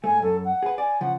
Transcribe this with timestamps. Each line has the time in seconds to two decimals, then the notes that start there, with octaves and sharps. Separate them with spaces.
0.04 G#2 A3 G#5
0.22 F#2 A4
0.45 F#5
0.63 G#4 B4
0.78 D5 G#5
1.01 C#3 F3 F#5